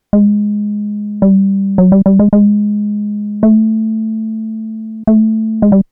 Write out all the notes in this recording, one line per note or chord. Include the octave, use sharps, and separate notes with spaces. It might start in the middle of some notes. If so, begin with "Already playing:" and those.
G#3
G3
F#3
G3
G3
G#3
G#3
A3
A3
G#3
G3